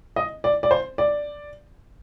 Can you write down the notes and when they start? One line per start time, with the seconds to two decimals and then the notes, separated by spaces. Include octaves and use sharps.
0.16 D#5
0.44 D5
0.63 D5
0.71 C5
0.98 D5